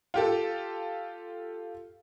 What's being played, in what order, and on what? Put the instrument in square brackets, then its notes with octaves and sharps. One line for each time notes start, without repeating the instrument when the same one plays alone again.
[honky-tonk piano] F4 G4 A4